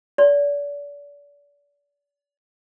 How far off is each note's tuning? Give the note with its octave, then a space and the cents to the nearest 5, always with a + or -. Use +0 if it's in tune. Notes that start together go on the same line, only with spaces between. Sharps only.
D5 -35